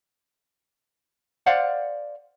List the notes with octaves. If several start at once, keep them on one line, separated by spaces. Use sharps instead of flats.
C5 D5 F5 F#5